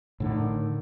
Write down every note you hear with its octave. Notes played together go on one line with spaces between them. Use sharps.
A2 D3 D#3